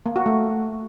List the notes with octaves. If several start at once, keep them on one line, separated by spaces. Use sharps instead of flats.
A#3
F#4
A3